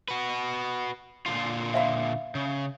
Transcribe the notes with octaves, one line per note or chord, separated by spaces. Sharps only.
F#4 B4
A#2 D3 F4
E5 F5 B5
C#3